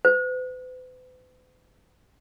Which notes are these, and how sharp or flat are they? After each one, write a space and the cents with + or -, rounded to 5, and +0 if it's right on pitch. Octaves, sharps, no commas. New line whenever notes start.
B4 +45